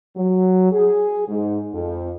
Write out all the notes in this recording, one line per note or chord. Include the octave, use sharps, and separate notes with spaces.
F#3
G#4
G#2
F2